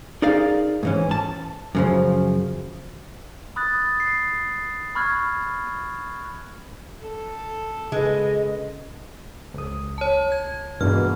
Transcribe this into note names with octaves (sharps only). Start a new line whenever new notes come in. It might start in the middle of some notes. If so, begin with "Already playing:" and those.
D#4 G#4 A#4 D5 F5
G#2 E3 C#4
A5
F#2 C#3 F3
B5 D#6 F#6 A6
C7
B5 C#6 F6 F#6 G#6
A4
C#3 G#3 B4 D#5
C#2 D#6
C#5 A5
G#6
G2 B2 E3 G#3 A#3 F6